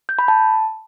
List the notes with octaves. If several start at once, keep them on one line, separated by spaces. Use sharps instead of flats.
G6
B5
A5